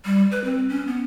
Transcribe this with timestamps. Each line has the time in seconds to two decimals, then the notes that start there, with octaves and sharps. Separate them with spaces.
0.05 G3
0.31 B4
0.44 C4
0.69 C#4
0.87 B3